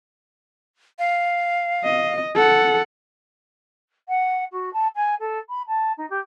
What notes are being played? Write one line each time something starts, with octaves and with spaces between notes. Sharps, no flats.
F5
D#5
A4 F#5
F#5
F#4
A5
G#5
A4
B5
A5
D#4
G4